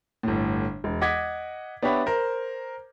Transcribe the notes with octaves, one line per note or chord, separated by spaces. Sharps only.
G1 A2
E1
D#5 F#5 D6 G#6 B6
B3 D4 G4 C#5 E5 B5
A#4 C5